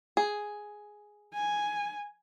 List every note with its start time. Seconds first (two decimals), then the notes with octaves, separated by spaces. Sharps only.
0.17 G#4
1.34 G#5